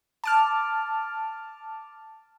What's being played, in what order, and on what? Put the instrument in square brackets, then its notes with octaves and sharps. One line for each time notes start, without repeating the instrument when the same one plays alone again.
[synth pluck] A5 D6 F6